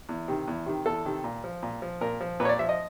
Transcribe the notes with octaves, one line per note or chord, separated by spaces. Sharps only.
E2
C3 D#3
E2
C3 D#3
E2 A4
C3 D#3
A#2
F3
A#2
F3
A#2 A#4
F3
A#2 B4
C#5
D5
F3 E5
D#5